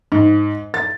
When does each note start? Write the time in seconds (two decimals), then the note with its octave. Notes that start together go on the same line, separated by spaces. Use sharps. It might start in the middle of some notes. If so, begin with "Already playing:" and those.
0.12 G#2
0.74 A6